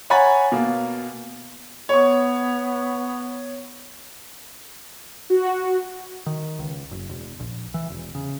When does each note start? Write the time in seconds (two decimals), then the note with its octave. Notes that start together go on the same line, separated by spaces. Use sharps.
0.10 C#5 F#5 G#5 A#5 B5 A6
0.52 B2 A#3
1.89 B3 C#5 C#6
5.30 F#4
6.26 D#3
6.59 C#2
6.91 F#1
7.09 E1
7.40 A#1
7.74 E3
7.90 E1
8.15 C#3